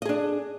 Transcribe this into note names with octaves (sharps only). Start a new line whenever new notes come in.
D4 G#4 D#5